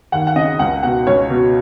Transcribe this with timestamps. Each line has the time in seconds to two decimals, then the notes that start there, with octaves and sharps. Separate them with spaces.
0.12 D#2 F#5
0.27 F#5
0.36 C#3 D#5
0.59 C#2 F#5
0.83 B2 F#5
1.07 C#2 C#5
1.30 B2